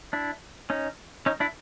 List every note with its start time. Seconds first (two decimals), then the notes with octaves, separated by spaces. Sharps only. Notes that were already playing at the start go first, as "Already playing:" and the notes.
0.13 D4 E4
0.70 C#4 D#4
1.26 C#4 D#4
1.40 D4 E4